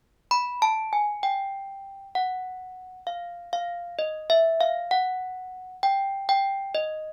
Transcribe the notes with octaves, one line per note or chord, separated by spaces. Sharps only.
B5
A5
G#5
G5
F#5
F5
F5
D#5
E5
F5
F#5
G5
G5
D#5